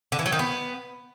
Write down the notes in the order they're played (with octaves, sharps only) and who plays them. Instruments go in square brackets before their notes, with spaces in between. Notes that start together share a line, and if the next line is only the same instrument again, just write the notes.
[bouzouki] D3
E3
F#3
D#3
B3